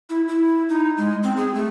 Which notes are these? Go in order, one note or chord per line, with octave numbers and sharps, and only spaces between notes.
E4
E4
D#4
G#3
C4
G#4
A3